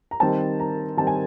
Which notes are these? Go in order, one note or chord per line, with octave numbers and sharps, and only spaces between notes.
A#5
D#3 G3 C4 A5
A#5
D#3 G3 C4 A5
G#5